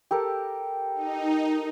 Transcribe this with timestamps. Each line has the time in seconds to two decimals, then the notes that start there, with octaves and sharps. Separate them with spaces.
0.11 G4 A4 A#4
0.95 D#4